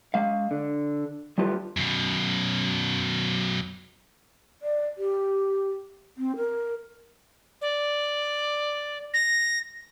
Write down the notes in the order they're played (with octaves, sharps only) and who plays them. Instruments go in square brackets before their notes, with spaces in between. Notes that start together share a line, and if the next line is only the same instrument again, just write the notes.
[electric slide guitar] G#3 F5
D3
G3 A3 F4 G4 B4
[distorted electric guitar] F#2 B2
[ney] D5
G4
C4
A#4
[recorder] D5
A#6